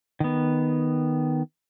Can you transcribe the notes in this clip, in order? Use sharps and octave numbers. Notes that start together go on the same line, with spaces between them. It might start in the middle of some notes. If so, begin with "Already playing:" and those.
D#3 B3